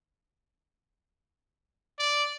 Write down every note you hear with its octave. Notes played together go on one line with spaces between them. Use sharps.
D5